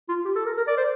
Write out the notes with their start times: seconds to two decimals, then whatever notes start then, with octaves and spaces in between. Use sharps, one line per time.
0.09 F4
0.25 G4
0.36 A4
0.46 A#4
0.57 A#4
0.68 D5
0.78 C5